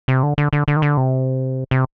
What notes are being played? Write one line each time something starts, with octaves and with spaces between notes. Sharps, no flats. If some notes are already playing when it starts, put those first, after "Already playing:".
C3
D3
D3
D3
D3
D#3
D3
C3
C3